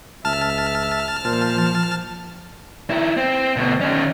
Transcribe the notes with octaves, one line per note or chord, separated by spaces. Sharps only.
C#2 E5 A5 F6
A#2 F3 C5
D#3 E4
C4
D2 B2
D#3 C#4